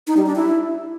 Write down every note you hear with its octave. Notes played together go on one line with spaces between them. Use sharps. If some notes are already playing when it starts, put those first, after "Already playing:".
D#4
G3
D4
E4